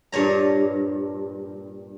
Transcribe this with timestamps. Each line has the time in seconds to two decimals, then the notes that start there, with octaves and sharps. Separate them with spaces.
0.12 G2 A#2 C#5 A#5